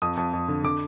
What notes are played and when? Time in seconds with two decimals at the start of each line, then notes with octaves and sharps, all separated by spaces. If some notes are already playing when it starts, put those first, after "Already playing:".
0.02 F2 D#6
0.17 F2
0.33 F2
0.48 D3
0.64 D3 D6